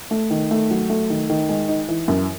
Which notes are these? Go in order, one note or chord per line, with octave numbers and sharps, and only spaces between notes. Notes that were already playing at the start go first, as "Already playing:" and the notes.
A3
D#3
A3
F#3
A3
D#3
D#3
G#3
D#4
E3
F#2